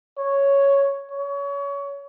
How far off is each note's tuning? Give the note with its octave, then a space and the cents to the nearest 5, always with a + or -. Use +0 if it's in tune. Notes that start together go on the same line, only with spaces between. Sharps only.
C#5 +0
C#5 +25